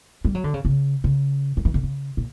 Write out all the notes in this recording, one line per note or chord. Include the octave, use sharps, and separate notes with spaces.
G3
F#3
D3
C#3
C#3
C#3
F#3
E3
D3
C#3
A#2